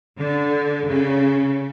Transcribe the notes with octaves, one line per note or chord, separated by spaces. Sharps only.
D3
C#3